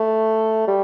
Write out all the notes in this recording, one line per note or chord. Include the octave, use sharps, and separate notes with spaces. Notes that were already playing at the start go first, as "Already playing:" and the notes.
Already playing: A3
G3